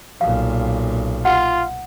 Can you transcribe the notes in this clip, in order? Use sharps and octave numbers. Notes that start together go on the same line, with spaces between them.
B1 A#2 F5
F4 F#5